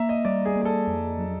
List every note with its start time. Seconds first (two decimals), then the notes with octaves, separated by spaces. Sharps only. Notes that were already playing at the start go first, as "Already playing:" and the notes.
Already playing: A#3 E5 A#5
0.09 D#5
0.25 G3 D5
0.45 G#4
0.56 A#3
0.61 G#4
0.65 A4
0.87 F2
1.18 F#3